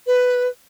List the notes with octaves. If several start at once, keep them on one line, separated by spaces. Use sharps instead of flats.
B4